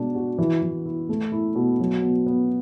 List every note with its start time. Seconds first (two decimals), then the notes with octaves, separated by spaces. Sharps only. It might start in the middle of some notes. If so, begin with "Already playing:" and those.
Already playing: B2 G#3 D4
0.15 F#4
0.38 E3
0.62 E3
0.85 E4
1.09 A3
1.32 E4
1.55 B2
1.80 F#3
2.02 B3
2.26 B3